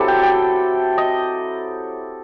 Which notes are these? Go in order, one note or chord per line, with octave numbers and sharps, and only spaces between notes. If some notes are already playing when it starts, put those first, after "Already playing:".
Already playing: F#3 C4 E4 G4 A4
G5
G5
D#5